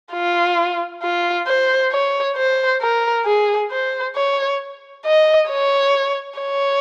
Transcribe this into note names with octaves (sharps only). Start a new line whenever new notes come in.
F4
F4
C5
C#5
C5
A#4
G#4
C5
C#5
D#5
C#5
C#5